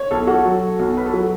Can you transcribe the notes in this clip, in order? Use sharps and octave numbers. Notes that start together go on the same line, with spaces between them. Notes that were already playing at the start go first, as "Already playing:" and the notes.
Already playing: C#5
B1 A4
F#4
F#3
B1
B4
A4
F#3 F#4